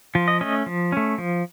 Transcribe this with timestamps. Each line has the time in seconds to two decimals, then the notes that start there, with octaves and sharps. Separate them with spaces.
0.15 F3 F4
0.28 D#5
0.41 A3 C#4 D#5
0.66 F3
0.92 A3 C#4
1.18 F3